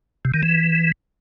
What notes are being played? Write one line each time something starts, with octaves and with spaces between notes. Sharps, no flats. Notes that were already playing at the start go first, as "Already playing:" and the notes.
C3
D#3
E3